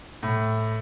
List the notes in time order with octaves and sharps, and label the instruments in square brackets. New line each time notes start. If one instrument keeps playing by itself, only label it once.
[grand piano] A2